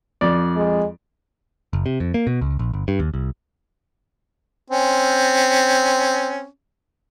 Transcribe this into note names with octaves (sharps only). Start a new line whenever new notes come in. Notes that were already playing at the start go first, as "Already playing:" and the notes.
F2 D5
G#3
F#1
C3
F2
A#3
B2
C#2
A#1
G1
G2
D#2
C2
C4 C#4